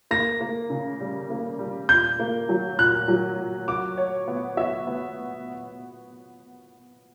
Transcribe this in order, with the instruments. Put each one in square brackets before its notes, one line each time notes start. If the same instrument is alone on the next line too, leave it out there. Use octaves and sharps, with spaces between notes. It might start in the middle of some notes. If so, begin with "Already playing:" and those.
[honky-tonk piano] A#3 [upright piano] A#6
[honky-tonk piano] A#3
C#3
G3
A#3
G3
[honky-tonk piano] A#2 [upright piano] G6
[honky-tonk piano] A#3
F#3
[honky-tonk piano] A#2 [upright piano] F#6
[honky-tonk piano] F#3
A#2
[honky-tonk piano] F#4 [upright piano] D6
[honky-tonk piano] C#5
B3
[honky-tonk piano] F#4 [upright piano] E5
[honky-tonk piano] B3